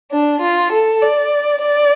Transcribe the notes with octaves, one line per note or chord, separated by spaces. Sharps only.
D4
F4
A4
D5
D5